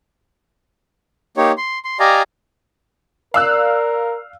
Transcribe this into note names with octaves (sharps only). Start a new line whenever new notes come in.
A#3 D#4 G4 C#5
C6
C6
G4 D5 D#5 F5 G#5 A#5
A#4 D5 F5 E6 F#6